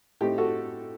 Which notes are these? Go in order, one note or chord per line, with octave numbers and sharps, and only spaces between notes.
A2 A3 C4 D#4 G4
F#4 A4